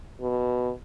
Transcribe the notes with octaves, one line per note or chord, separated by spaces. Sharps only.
B2